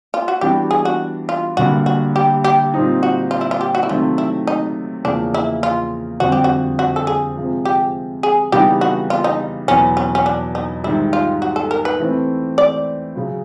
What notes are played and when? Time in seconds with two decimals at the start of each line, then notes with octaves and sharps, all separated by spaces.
0.14 F4
0.28 F#4
0.41 E3 G3 B3 D4 F#4 G4
0.71 G#4
0.85 F#4
1.29 F4
1.57 G2 D3 G3 A#3 F#4
1.86 F#4
2.16 G4
2.44 G4
2.74 A#2 G3 C4 D#4
3.03 F#4
3.31 F4
3.41 E4
3.51 F4
3.61 G4
3.75 F#4
3.83 E4
3.89 C3 D#3 F#3 A3 F4
4.18 E4
4.47 D#4
5.04 E2 C#3 F3 A#3 D4
5.34 E4
5.63 F4
6.20 F2 D3 G3 C4 F4 F#4
6.32 G4
6.44 F#4
6.79 F#4
6.96 A4
7.07 G#4
7.36 C3 F3 G#3
7.65 G4
8.23 G#4
8.52 C#3 E3 G3 B3 D#4 G4
8.81 F#4
9.10 F4
9.24 D#4
9.68 E2 B2 F#3 B3 C#4
9.97 C#4
10.15 C#4
10.26 D4
10.55 D#4
10.84 G#2 D#3 G3 E4
11.13 F4
11.42 F#4
11.56 A4
11.71 A#4
11.85 B4
12.00 E3 A3 C4
12.58 D5
13.15 C#3 F#3